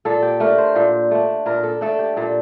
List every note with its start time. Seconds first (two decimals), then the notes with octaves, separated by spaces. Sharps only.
0.05 A#2 A4
0.22 G4
0.40 A3 D4 A#4
0.58 C5
0.75 A#2
1.11 A3 D4
1.46 A#2 A#4
1.63 A4
1.81 A3 D4 A4
1.99 G4
2.16 A#2 A4